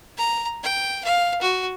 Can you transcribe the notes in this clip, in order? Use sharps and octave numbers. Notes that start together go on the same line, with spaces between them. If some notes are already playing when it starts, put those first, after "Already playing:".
A#5
G5
F5
F#4